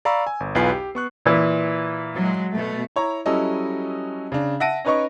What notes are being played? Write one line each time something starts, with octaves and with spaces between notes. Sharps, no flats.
D5 F5 A#5 B5 C#6 E6
G#5
G1
B1 E2 F4 B4 G#5 C7
G4
B3 C#6 F#6
A#2 E3
F#3 G#3
B2 A3
E4 C#5 A#5
F#3 G3 C#4 E4 A4 D#5
C#3 D4
E5 F#5 A5 A#6 D7 D#7
C#4 D#4 B4 C#5 D#5 C#6